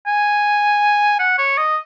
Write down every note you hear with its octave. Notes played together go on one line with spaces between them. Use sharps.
G#5
F#5
C#5
D#5